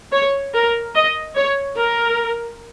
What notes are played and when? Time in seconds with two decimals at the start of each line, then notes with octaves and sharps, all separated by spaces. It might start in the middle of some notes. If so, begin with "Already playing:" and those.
0.13 C#5
0.54 A#4
0.95 D#5
1.35 C#5
1.77 A#4